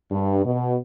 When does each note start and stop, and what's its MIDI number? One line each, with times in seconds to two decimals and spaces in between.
0.11 0.43 43
0.45 0.75 47